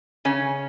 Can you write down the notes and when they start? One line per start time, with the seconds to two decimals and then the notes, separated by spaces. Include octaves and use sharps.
0.25 C#3 C#4